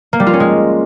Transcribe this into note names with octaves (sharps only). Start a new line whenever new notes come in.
A#3
G3
F4
C#4
G#3